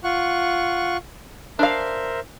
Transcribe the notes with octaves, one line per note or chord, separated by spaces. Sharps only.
F4 F#5 C#6
D4 A#4 C5 E5 F5